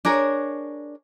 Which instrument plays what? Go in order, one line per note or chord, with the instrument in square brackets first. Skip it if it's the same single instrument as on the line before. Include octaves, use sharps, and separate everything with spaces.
[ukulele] D4 G#4 A#4 C#5